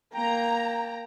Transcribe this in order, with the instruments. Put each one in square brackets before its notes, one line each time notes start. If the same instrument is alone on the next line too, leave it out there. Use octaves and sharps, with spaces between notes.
[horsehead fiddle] A#3 [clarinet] G5 [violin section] A#5